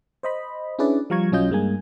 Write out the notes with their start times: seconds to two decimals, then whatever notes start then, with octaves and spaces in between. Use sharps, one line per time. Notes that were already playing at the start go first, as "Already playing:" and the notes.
0.23 C5 D#5 B5
0.79 C#4 D4 E4 G#4 B4 D5
1.10 F3 G3 F5 A#5 C#6 G#6
1.32 B1 F#3 C#4 F4 D#5 G6
1.50 G2 G#3 A#3 G#5